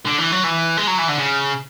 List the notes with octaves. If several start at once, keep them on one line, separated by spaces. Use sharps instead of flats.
D3
E3
F#3
E3
G#3
F#3
E3
D3
C#3